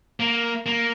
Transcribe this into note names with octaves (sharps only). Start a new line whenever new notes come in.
A#3
A#3